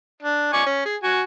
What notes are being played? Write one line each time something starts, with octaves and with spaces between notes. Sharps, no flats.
D4
D5 G#5 C#6
C#4
G#4
F#4 G#5